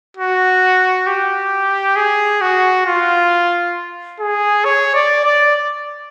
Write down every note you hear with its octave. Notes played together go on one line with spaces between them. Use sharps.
F#4
G4
G#4
F#4
F4
G#4
C#5
D5
D5